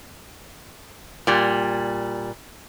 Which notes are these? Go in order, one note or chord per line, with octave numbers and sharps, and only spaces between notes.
A#2 G3